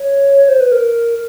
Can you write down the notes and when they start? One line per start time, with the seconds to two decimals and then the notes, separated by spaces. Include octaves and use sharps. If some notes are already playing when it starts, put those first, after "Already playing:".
Already playing: C#5
0.49 C5
0.61 B4
0.72 A#4